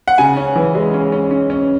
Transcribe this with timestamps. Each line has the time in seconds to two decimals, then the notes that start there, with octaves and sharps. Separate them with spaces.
0.08 F#5
0.18 C#3 G#5
0.37 C#4
0.56 E3
0.75 G#3
0.94 C#4
1.12 C#4
1.31 C#4
1.50 C#4